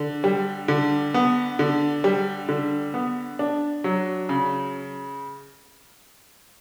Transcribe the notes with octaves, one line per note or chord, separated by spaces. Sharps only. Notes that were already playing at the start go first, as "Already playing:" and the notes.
Already playing: D3
G3
D3
B3
D3
G3
D3
B3
D4
F#3
C#3